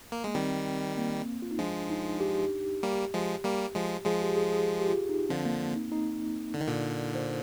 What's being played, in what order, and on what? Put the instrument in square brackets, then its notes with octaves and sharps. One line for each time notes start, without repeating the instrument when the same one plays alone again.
[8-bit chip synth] A#3
[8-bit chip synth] G#3 [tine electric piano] A#3
[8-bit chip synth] D#3 G3 [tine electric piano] C4
[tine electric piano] A#3
F4
D#4
[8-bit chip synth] F3 G#3 [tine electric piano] D4
[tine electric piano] D#4
G4
[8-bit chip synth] G3 A#3
F3 G#3
G3 A#3
F3 G#3
[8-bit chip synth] F3 G#3 [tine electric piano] G#4
[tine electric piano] G4
G#4
G#4
G#4
G4
F4
D#4
[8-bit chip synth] D3 F3 [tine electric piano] C4
[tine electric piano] A#3
D#4
D#4
[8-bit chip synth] D3
D#3
A#2 D3
[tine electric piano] C5